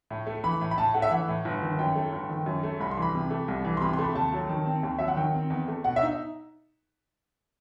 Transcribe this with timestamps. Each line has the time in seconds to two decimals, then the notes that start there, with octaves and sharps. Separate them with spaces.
0.11 A2
0.27 A3
0.44 E3 B5
0.61 A2
0.71 B5
0.78 A2 A5
0.94 A3 F#5
1.02 E5
1.11 E3 F#5
1.28 A2
1.45 G1
1.63 D#3
1.79 F#2 G5
1.96 A3
2.12 G1
2.29 D#3
2.46 F#2
2.63 A3
2.80 C2 B5
2.91 C6
2.97 E3 B5
3.15 C3
3.30 A3
3.48 C2
3.65 E3
3.77 C6
3.81 C3 B5
3.93 C6
3.99 A3
4.04 B5
4.15 D#2 A5
4.33 F#3
4.50 D#3
4.66 C4
4.83 D#2
4.99 F#3 E5
5.08 F#5
5.16 D#3 G5
5.34 C4
5.50 E2
5.68 A3
5.84 B2 F#5
5.96 E5
6.02 D#4